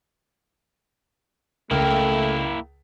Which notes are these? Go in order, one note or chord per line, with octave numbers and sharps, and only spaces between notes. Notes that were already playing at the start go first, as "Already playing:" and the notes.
C#2 A3 A#3 E4 A#4 G5